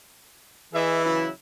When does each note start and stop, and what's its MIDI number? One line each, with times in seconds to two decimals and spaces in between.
0.73 1.25 52
0.73 1.04 68
0.73 1.04 75
0.73 1.04 76
1.04 1.29 49
1.04 1.29 54
1.04 1.29 64